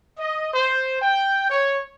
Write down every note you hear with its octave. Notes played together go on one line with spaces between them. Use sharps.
D#5
C5
G5
C#5